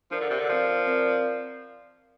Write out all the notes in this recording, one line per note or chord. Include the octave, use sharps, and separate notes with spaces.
F3 D4 A#4 D5
D3
C3
D3
F3 C4 A#4 D5 F5
C4 A#4 D5 F5